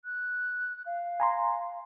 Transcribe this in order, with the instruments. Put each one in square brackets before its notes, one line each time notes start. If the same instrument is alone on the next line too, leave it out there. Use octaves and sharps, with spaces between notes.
[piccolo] F#6
F5
[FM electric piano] G#5 A#5 C6